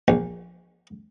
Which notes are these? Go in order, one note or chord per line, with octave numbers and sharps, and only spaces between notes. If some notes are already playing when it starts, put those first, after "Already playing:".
A#1